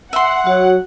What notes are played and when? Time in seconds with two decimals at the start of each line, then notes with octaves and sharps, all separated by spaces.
0.13 E5 F#5 C6
0.47 F#3 F#4